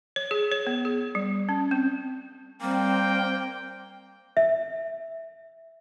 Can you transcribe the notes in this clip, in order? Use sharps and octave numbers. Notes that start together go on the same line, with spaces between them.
C#5
G#4
C#5
B3
G#4
G3
C#4
C4
G3 A#3 C4 G5
E5